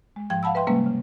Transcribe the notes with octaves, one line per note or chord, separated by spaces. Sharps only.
G#3
G#2 F3 G5 G#6
F5 F#5 A5 B5 E6
B4 E5 G5 C6
C3 G3 G#3 A#3 C#4 B4
C#3